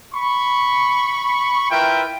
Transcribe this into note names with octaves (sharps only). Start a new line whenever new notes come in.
B5 C#6
E4 F4 A#4 B4 E5 G5